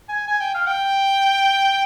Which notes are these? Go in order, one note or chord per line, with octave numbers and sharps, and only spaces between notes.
G#5
G#5
G5
F5
G5